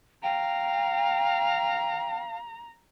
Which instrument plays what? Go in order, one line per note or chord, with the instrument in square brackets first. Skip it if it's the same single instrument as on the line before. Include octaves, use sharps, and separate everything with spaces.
[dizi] F5 [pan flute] G5 [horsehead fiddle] A#5